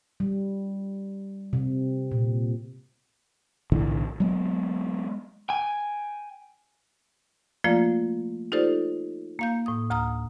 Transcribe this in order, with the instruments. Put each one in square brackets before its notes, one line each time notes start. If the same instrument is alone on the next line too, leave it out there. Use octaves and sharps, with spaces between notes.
[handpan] G3
C3
A#2
[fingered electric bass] B1 A2 D3 E3
F#3 G#3 B3
[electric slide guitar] G5 G#5
[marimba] F3 A3 A#3 F4 D5 F5
D#4 F4 G4 A4 C5 D5
A#3 F5 G6
A2 D#6
D2 A#5 D#6 F6